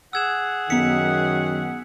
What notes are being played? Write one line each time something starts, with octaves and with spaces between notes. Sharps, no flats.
G#4 F#5 E6 G#6 E7
F#2 D#3 B3 B6 C#7